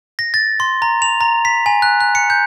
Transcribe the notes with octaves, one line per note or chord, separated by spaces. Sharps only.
A#6
A6
C6
A#5
F7
A#5
B6
G#5
F#6
F#6
C#7
G6